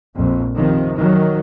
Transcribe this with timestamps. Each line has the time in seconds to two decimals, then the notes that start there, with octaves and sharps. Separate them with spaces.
0.17 A#1 F2
0.55 C3 D#3 F3
0.95 D#3 F#3